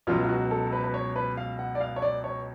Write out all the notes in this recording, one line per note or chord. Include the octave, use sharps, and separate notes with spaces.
C#2 B2 F#3 F4
F4
F#4
A4
B4
B4
C#5
B4
F5
F#5
D5
F5
C#5
D5
C#5